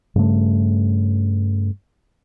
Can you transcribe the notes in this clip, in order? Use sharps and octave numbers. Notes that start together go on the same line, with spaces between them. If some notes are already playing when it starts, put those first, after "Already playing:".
G2 C#3 A3